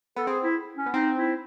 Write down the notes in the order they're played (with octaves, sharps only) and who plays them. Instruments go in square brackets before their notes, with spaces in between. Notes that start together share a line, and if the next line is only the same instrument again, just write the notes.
[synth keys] B3 [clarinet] A4
[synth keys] C4 [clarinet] G#4
[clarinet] E4
C#4
[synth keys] B3
[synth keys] C4 [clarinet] D#4
[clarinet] E4